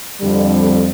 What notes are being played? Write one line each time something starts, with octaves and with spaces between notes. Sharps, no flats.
F2 D3 G3